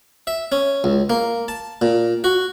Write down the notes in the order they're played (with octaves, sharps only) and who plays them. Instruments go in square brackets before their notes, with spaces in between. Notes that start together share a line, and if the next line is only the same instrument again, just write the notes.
[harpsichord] E5
C#4
C#2
A#3
A5
A#2
F#4